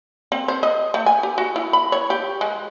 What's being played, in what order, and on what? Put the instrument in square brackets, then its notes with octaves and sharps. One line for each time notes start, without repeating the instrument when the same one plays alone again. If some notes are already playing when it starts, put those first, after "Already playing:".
[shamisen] C4
C5
D#5
A3
G#5
G4
F#4
E4
B5
C#5
G4
G#3